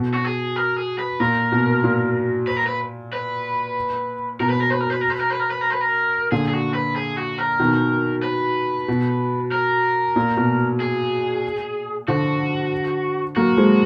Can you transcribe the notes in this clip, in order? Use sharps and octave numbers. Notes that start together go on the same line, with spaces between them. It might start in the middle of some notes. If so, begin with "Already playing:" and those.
Already playing: B2
F#4
G#4
A#4
G#4
B4
A#2 A#4
B2
A#2
B4
A#4
B4
B4
B2 A#4
B4
A#4
B4
A#4
B4
A#4
B4
A#4
B4
A#4
B4
A#4
B4
A#4
A#2 D3 G#4
G#4
F#4
B4
G#4
F#4
A#4
B2 D#3
B4
B2
A#4
A#2
B2
G#4
D3 F3 F#4
F#3 A#3 F#4
F3 G#3